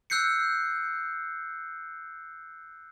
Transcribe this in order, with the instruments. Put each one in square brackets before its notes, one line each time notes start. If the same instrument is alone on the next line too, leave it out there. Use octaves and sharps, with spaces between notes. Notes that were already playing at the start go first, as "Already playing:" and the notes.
[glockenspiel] E6 F#6 G6 C7 C#7